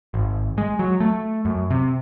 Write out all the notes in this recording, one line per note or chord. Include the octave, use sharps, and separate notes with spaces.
G#1
G#3
F#3
A3
F#2
C3